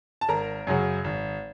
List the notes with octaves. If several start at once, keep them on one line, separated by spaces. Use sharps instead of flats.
A5
G#1 A#4 A#5
F#2 C#3 F#3
G#1